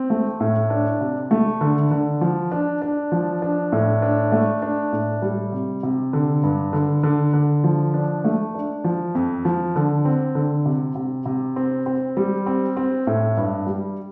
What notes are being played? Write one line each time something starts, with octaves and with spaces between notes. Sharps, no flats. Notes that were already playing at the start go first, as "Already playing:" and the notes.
Already playing: C4
A3
A2
D4
C3
A3
D3
D3
F3
D4
D4
F3
D4
A2
D4
A3
D4
A2
G3
C3
C3
D3
G2
D3
D3
D3
F3
D4
A3
D4
F3
F2
F3
D3
C4
D3
C3
C3
C3
C4
C4
G3
C4
C4
A2
G2
G3